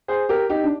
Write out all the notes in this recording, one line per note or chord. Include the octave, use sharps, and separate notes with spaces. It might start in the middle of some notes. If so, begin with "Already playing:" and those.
G#4 C5
G4 A#4
D#4 G4
D4